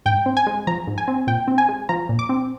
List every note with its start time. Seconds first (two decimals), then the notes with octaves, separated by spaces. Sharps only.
0.06 G#2 G5
0.26 C4
0.37 G#5
0.47 G#3
0.67 F3 A#5
0.87 G#2
0.98 G#5
1.08 C4
1.27 A#2 G5
1.48 C4
1.58 G#5
1.69 G#3
1.89 F3 A#5
2.09 A#2
2.19 D6
2.29 C4